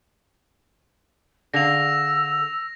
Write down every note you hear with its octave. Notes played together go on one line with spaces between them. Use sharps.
D3 G#4 F5 E6 A#6 F7